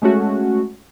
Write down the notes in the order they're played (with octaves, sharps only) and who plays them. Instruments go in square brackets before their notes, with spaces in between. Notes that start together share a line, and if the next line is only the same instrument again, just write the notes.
[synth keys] G#3 A3 C#4 F#4